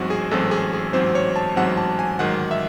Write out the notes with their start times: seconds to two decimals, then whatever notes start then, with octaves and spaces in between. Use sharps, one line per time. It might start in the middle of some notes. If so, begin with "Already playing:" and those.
Already playing: A1 G#2 F#3 C4 F#4
0.10 G#4
0.31 A1 G#2 F#3 C4 A4
0.51 G#4
0.73 G#4
0.93 A1 G#2 F#3 C4 C5
1.15 C#5
1.36 A5
1.56 A1 G#2 F#3 C4 F#5
1.77 A5
1.99 G#5
2.19 A1 G#2 D#3 F#3 F#5
2.51 E5